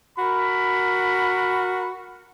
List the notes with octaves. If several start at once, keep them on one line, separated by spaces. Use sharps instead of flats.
F#4 A#4 B5